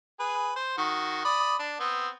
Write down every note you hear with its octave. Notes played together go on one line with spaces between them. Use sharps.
G#4 B4
C5
D#3 F#4
D5 B5 D#6
D4
B3 C4